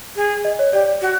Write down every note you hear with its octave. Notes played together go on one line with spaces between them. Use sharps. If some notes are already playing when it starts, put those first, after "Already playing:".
G#4
D#5
C#5
G4 D5
F#4